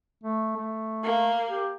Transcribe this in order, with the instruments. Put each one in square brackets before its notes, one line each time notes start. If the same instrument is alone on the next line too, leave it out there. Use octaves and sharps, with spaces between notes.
[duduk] A3
A3
[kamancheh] A#3
[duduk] G4